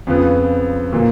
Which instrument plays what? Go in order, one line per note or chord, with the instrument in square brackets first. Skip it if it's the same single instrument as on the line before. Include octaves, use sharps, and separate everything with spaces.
[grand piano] F2 C#3 F3 B3
A#2 F3 A#3